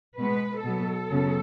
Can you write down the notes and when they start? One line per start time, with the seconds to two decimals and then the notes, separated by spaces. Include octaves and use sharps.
0.18 B2 G#3 B3 B4
0.64 B2 F#3 B3 A4
1.10 F#2 C#3 F#3 B3